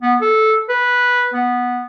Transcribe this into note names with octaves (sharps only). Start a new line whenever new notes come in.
B3
A4
B4
B3